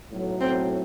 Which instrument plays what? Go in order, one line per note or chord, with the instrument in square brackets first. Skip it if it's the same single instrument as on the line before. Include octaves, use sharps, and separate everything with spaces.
[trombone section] B1 A2 F#3
[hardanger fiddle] C4